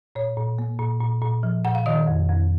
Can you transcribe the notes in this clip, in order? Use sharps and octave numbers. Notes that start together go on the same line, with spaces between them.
A#2 C#5
A#2
A#3
A#2
A#2
A#2
F3
A#2 F#5
F5
D#3 D#5
F2
F2